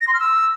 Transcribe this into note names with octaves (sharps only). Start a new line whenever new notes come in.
A#6
C6
F6
E6